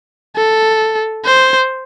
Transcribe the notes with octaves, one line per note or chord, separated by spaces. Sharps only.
A4
C5